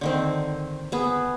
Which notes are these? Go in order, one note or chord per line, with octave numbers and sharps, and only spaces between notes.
D3 D#3 C4
B3 G#4